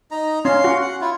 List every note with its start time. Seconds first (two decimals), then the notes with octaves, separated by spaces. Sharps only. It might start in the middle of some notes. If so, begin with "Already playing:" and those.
0.11 D#4 A#5
0.45 C#4 F5 C6
0.64 F#4
0.82 F#5
1.01 E4 F4